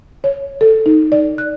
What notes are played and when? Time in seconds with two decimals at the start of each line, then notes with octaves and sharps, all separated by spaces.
0.24 C#5
0.61 A4
0.86 D#4
1.12 D5
1.38 F#6